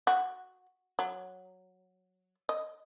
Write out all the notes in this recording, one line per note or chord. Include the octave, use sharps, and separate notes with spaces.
F#4
F#3
D#5